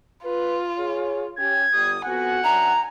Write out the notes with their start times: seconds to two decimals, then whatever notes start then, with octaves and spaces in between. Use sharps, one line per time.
0.25 F4 B4
0.78 G#4 C#5
1.38 C#4 G4 G#6
1.73 G1 G3 D#6
2.06 F2 B3 F#4 F#5 G#5
2.44 F#2 D4 E5 A#5